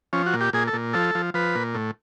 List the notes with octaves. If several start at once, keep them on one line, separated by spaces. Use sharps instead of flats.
F3 C#4
F#4
A#2
G4
A#2 G#4
A4
A#2
F3 A4
F3
F3 B4
A#2
A2